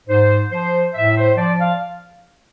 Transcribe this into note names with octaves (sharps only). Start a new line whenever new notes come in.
G#2 C5
F3 C5
A2 E5
C5
F3 D5
F5